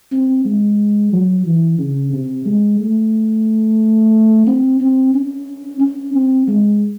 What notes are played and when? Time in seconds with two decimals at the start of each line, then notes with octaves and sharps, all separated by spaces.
0.12 C4
0.45 G#3
1.12 F#3
1.46 E3
1.79 C#3
2.13 C3
2.46 G#3
2.80 A3
4.47 C4
4.80 C4
5.14 C#4
5.80 C#4
6.14 C4
6.47 G#3